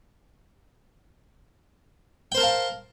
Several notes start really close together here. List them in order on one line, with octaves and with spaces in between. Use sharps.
G5 C5 A#4 A5 F5